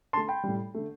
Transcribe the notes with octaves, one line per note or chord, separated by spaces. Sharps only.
D3 A3 A5 C6
G5 B5
A2 G3
D3 A3